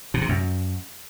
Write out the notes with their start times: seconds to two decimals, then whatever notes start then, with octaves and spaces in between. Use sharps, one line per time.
0.14 B2
0.21 C3
0.29 F#2